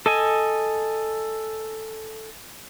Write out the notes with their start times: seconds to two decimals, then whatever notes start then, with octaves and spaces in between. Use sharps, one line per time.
0.06 A4 D#5 G#5